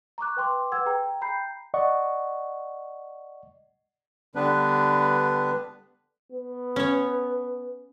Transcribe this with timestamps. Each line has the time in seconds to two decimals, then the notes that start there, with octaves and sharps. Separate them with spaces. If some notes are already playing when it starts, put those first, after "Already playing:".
0.18 A#5 C#6 D6 F#6
0.37 B4 G5 C6 D6
0.72 B4 F#5 E6 G#6
0.86 G#4 G5 A#5
1.21 G5 A#5 B5 G6 C7
1.74 D5 D#5 F#5 C#6
4.35 D3 G3 B3 D4 B4
6.32 B3
6.76 C#4 C#5